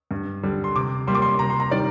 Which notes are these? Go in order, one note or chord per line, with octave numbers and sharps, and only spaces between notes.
G2
D3 G3
C6
C3 D6
G3 A#3 C6
D6
C6
C3 A#5
C6
A#5
D#3 G3 D5